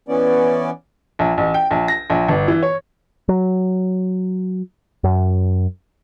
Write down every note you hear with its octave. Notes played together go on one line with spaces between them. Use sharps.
E3 B3 C#4 D5
A#1
A1
G5
A#1
A#6
A#1
G1
E3
C#5
F#3
F#2